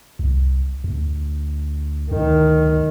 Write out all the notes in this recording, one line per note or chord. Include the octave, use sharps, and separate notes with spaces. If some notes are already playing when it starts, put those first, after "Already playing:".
C2
D2
D2 D#3